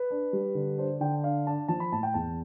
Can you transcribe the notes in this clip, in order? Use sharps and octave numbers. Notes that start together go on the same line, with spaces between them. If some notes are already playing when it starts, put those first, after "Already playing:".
Already playing: B4
D4
G3
D3
D4 C5
D3 G5
D4 F5
D4 A5
F3 A5
B5
A2 A5
G5
E2 A5